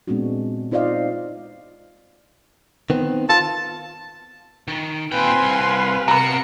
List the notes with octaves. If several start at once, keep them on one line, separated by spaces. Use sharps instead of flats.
A#2 G#3 B3 C4 D4 F#4
D#4 F4 C5 D5 D#5 F5
D#3 B3 C4
F4 A5
D#3
A#2 C4 B4 F5 G5 G#5 C6
C2
C3 B3 F#4 A#4 A#5 B5 C#7